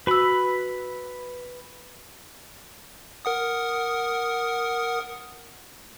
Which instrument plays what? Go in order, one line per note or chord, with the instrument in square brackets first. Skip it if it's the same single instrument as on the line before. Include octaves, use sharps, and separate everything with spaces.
[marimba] F#4 E6 [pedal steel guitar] B4 B5
[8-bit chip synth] A#4 F#5 D#6